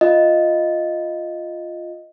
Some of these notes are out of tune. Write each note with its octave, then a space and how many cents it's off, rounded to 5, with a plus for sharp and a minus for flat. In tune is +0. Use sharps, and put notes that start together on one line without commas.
F4 +0 D#5 +0